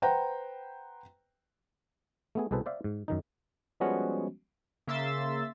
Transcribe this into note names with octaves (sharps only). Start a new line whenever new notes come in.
B4 C5 F#5 G5 A#5
A3 B3 G#4
C2 B2 G#4 A4 B4 C5
C5 D5 E5 F5
G#2
F#2 D#3 D#4
F3 G3 G#3 B3 C#4 F#4
C#3 A#3 E5 C6 E6 A6